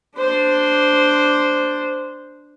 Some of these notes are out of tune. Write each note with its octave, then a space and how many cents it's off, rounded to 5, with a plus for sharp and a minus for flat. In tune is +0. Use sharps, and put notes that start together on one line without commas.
D4 +0 C5 -10